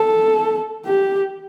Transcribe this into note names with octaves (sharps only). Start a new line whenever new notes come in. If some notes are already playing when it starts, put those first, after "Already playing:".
Already playing: A4
G4